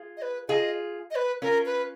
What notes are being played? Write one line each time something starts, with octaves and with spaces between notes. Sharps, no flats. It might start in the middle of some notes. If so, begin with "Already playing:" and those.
Already playing: F4 G#4
D#5
B4
F4 G#4 D#5
D#5
B4
C#4 F4 A#4
B4